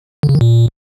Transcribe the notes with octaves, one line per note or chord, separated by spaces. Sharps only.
D3
C#3
D#3
A#2